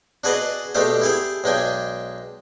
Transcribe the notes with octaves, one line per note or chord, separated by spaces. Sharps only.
D4 F#4 G#4 B4 D5 D#5
B2 G#3 A3 D4 G4
E4 G4 G#4
B1 G#3 D4 G5 G#5